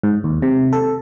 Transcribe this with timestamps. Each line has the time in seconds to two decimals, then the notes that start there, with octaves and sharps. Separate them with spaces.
0.03 G#2
0.24 D#2
0.42 C3
0.73 A4